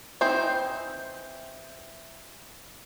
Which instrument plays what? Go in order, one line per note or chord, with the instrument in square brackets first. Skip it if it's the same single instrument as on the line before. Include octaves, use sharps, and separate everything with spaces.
[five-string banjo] E3 C4 D#4 C5